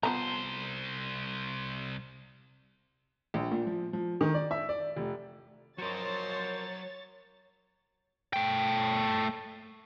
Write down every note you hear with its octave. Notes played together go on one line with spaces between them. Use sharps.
C2 F3 B3 C5 A#5
A#1
A#2
F3
F3
D#3
D5
E5
D5
F1
F3 F#3 F#4 A#4 C5 C#5 D#5 A6
A3 G5